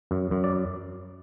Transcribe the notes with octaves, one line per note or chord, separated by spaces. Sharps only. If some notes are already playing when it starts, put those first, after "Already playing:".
F#2
F#2
D5